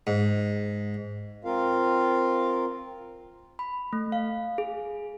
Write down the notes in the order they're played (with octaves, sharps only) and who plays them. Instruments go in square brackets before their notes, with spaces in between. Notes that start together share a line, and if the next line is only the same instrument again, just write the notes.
[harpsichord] G#2
[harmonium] C4 F4 A#4 F5
[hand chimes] B5
A3
F5
G#4